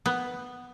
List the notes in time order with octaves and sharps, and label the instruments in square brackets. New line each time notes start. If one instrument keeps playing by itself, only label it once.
[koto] B3